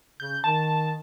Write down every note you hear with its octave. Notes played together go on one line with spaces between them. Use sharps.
C#3 G6
D#3 A5